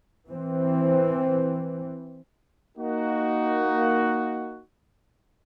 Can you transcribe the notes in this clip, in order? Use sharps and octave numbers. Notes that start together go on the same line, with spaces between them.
E3 C4
A#3 D#4 F#4